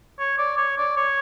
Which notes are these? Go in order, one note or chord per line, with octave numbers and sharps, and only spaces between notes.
C#5
D5
C#5
D5
C#5